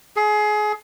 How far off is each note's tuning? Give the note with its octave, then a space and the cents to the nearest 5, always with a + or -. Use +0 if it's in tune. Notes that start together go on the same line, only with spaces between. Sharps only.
G#4 +25